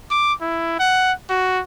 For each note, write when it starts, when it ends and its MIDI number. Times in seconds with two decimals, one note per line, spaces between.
0.11 0.33 86
0.41 0.79 64
0.79 1.12 78
1.30 1.61 66